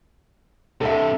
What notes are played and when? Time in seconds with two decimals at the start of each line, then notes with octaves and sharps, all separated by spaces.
0.81 G2 C3 A4 E5